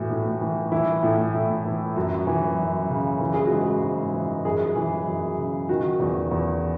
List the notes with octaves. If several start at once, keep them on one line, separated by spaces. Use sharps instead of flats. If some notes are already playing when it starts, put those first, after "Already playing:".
Already playing: A2 E3 F#4
A2
E3
E3 E4
A2
A2
E3
F#2 F#4
E3
F#2
C#3
E3
G#4
F#4
G#2
G#4
G#2
E3
F#2 G#4
E3
F#2
C#3
D#3 F#4
E2
E2